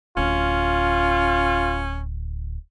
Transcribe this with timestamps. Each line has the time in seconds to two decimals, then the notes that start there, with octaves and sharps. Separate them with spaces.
0.17 D1 C#4 F4